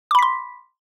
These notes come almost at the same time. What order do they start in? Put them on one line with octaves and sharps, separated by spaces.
D6 B5 B6 C6